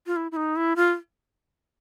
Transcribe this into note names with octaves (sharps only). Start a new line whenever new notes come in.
F4
E4
E4
D#4
E4
F4